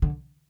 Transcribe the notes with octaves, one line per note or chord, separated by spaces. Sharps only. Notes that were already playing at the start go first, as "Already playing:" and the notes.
D3